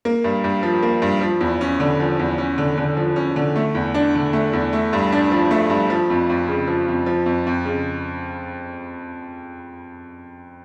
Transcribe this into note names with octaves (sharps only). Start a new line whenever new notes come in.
A#3
G2
G2
F3
A#3
G2
F3
E2
C#4
D3
F3
E2
C#4
D3
D3
F3
C#4
D3
A3
E2
D4
D3
A3
E2
A3
G2
D4
F3
A3
G2
F3
F2
F2
C#3
F3
F2
F3
F2
F2
C#3